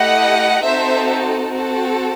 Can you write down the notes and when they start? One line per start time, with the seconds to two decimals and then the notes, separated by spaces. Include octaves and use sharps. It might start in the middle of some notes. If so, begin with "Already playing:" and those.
Already playing: A3 E4 G4 D#5 F#5
0.64 C4 D#4 F#4 A4 C5 E5
1.51 C4 F#4 A4